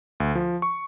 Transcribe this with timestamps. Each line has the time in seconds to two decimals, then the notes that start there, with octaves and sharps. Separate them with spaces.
0.20 D2
0.35 F3
0.62 C#6